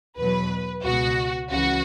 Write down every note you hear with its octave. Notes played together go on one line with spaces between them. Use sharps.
E2 B2 F#3 B4
C#2 B2 B3 F#4
C#2 C#3 E3 F#4